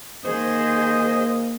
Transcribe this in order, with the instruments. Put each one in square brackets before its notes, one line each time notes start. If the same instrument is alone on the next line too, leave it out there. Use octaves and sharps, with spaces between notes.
[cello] D#3 G#4 [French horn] A#3 [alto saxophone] C5 [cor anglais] D#5